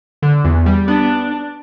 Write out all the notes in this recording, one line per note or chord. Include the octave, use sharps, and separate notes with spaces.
D3
E2
G3
B3 D4